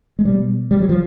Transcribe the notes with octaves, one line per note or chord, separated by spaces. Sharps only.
G#3
B2 G3
G3
F#3
F3